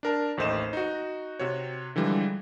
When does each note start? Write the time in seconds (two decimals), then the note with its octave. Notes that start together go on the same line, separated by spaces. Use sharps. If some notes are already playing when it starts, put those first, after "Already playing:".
0.03 D4 A#4 A5
0.37 A1 D#2 A3 C5 D#5 E7
0.73 D#4 F#4
1.39 C3 F#4 C#5
1.96 D3 E3 F3 G3 G#3